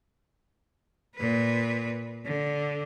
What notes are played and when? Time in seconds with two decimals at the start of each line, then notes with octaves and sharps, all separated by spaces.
1.16 A#2 B4
2.25 D3